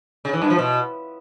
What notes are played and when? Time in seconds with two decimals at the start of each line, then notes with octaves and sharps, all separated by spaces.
0.25 C#3
0.33 E3
0.42 G2
0.50 F3
0.58 B2